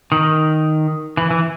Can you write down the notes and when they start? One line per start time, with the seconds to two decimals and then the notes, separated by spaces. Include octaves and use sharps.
0.12 D#3
1.17 E3
1.30 E3